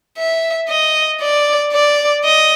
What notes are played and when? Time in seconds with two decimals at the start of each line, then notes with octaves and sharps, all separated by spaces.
0.18 E5
0.69 D#5
1.21 D5
1.73 D5
2.25 D#5